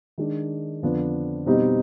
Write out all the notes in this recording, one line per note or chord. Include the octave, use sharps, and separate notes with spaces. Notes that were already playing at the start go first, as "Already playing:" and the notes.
D#3 G#3 D4
F2 D3 F3 B3 D4
B2 G3 C4 D#4